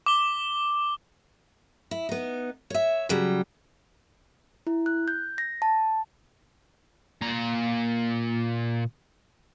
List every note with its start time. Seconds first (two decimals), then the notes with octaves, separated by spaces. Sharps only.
0.06 D6 G7
1.91 E4
2.09 B3 D#4
2.70 C#5 E5
3.09 C#3 F#3 G3
4.67 E4
4.86 F#6
5.08 G6
5.38 A#6
5.62 A5
7.21 A#2 A#5